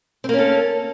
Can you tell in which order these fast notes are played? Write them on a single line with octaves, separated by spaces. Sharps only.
C4 A#3 C#4 A4